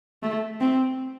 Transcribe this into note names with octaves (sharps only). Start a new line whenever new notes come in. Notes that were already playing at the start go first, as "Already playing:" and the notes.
A3
C4